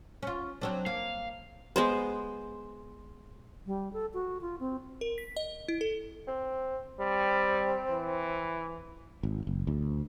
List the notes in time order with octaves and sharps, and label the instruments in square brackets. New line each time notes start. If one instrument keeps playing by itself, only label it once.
[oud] C#4 F4
F#3 C4 D4
[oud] A#3 [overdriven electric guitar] F5
[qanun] G#3 B3 C5
[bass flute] G3
A4
F#4
F4
C4
[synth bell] A#4
B6
D#5
E4
A4
[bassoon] C4
[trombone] G3 [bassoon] C4
[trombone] E3
[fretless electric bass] G#1
F#1
D2